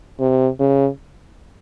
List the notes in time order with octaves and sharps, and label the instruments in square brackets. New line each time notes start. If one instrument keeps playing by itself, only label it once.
[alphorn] C3
C#3